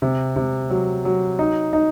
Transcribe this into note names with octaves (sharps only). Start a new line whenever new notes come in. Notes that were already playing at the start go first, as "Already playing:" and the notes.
C3
C3
F#3
F#3
D#4
D#4